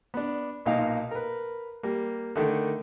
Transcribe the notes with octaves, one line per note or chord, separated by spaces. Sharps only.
B3 D4
B1 A#2 D#4 F5
A#4 B4
G3 A#3
D3 D#3 A3